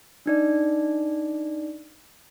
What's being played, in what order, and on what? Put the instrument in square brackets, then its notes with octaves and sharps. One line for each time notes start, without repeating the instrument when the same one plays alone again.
[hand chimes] D4 D#4 D5